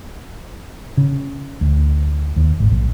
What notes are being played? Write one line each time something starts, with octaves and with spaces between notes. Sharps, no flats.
C#3
D2
D#2
G#1
A#1